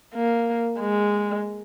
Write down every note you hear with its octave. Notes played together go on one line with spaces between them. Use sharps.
A#3
G#3